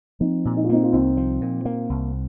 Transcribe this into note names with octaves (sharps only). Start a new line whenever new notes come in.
F3 C4 D#4
A#2
D#4
F4
A#3 C4 D#4
F4
C2 C4 D#4
F3
A#2
A#3
C2